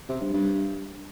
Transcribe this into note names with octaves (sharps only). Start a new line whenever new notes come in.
C3
G2
G2